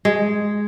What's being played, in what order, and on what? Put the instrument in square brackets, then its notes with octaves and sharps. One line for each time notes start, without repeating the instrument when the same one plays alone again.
[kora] G#3